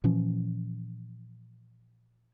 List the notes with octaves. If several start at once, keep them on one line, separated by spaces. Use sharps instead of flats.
A#2 E3 F3 C#4